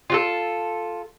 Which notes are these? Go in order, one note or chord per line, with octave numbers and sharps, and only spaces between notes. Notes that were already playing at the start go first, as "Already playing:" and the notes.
F4 F#4 A4